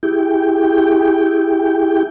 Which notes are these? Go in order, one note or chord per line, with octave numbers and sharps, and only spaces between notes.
E4 G4 G#4 G5